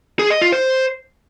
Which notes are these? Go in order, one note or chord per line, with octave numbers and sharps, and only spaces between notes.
G#4
D#5
F4
C5